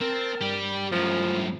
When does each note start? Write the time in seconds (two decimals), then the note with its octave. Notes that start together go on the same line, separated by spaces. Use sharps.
0.01 C4 A#4 A5
0.41 G2 G4 D5
0.92 F#2 A2 F3